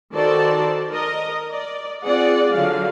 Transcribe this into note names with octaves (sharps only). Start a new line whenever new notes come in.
D#3 F#4 A4 C5 D5 A5
A#4 D#5
D5
C4 F4 G#4 D5 F#5
D3 F#3 F5